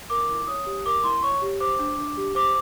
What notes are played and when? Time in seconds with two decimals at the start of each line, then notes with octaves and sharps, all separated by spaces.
0.10 A#4 D6
0.29 E4
0.47 C#5 D#6
0.66 G4
0.86 A#4 D6
1.04 E4 C6
1.22 C#5 C#6
1.42 G4
1.60 C5 D6
1.79 D4
1.98 D4
2.17 G4
2.35 C5 D6